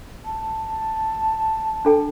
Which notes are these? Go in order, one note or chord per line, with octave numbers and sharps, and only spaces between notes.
A5
D4 A4 G5